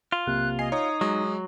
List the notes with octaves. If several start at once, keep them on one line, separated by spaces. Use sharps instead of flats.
F4
B1 C3 A#3 F#6
D#5 G#5 C7
D#4 C#5 D#6
F#3 G#3